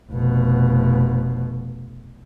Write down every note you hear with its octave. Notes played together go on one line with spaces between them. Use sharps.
F1 B2